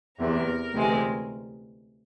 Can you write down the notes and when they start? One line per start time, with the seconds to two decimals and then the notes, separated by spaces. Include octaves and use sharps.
0.18 E2 C3 E3 A#4
0.73 D2 C3 E3 G#3